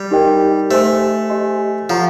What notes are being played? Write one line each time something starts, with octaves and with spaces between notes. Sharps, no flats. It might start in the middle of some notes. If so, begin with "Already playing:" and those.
Already playing: G3
D#4 G4 A#4 D#5 G5
A3 G4 C5 D#5 G#5 C6
G4 C5 D#5 G#5 C6
F3 A4 C#5 F#5 A#5 C#6